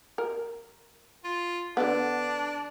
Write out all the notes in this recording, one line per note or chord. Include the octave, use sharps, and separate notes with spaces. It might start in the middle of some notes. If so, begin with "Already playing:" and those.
A#4
F4
D3 B3 D4